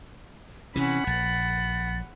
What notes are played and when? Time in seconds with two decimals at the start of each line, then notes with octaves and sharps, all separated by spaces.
0.76 C3 E3 C#4 F#5 B5
1.07 A#1 A6